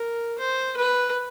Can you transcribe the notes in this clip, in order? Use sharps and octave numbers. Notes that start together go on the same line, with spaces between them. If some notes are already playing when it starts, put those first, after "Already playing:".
Already playing: A#4
C5
B4